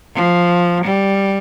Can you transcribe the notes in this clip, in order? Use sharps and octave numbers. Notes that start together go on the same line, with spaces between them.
F3
G3